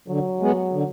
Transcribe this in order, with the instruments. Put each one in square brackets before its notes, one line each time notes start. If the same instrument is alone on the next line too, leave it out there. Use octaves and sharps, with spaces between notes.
[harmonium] D3 [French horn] F#3
[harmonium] G#3 B3
D3